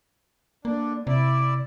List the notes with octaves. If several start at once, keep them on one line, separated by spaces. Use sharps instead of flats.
D3 A#3 D4
C3 E4 D5